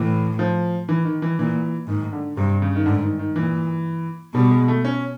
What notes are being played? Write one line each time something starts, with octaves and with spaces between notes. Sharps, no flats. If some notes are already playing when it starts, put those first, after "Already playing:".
Already playing: A2 E3
F3
E3
D#3
E3
A#2 E3
G#2 D#3
D3
G2 C3
C#3
D#3
G#2 D3
D#3
D#3
A#2 E3
B2 G3
G#3
A3
C#4